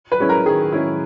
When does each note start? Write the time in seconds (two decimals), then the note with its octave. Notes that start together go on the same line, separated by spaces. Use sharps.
0.12 B4
0.20 G#3 C#4 E4
0.29 A#4
0.46 D#3 G#4
0.72 G#3 C#4 E4